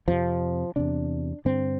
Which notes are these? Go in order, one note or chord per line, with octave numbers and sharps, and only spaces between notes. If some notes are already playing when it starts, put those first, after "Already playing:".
F2 C3 F3
E2 C3 D4
G2 D3 C4